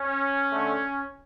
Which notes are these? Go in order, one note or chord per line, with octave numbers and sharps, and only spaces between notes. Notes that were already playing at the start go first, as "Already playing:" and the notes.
Already playing: C#4
D3 A3